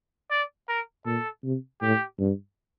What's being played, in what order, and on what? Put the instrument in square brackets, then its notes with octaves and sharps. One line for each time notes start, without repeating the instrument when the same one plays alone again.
[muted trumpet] D5
A#4
[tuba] A#2 [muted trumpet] A4
[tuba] C3
[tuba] A2 [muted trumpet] G4
[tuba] G2